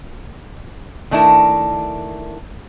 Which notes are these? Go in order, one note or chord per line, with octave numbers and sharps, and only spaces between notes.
D#3 A3 D4 E4 A#4